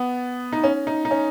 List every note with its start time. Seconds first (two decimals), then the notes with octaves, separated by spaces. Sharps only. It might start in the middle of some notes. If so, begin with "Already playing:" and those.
Already playing: B3
0.53 D#4
0.64 C#4
0.87 D#4
1.05 D#4
1.11 C#4